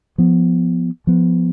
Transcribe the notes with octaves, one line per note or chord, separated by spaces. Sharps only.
F3 B3
F3 B3